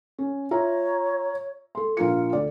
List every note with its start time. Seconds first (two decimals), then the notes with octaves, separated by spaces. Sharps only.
0.18 C#4
0.51 F4 C#5 E5 A#5
1.75 A4 C6
1.97 A#1 F4 A#4 C#7
2.33 D2 D5